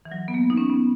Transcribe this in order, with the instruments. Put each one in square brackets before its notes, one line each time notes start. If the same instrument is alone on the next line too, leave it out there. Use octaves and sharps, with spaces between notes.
[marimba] E3
F#3
B3
A#3
D#4
C#4
B3